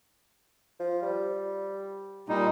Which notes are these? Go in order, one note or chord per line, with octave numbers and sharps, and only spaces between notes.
F3
G3
A#2 G3 D#4